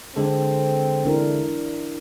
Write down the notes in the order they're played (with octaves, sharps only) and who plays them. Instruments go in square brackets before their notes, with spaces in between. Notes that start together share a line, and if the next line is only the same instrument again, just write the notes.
[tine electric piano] D3 G#3 A4 [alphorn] C4
[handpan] D4 E4 A#4